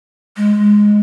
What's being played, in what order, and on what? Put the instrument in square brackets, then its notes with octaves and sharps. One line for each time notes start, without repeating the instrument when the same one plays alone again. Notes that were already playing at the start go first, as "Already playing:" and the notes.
[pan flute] G#3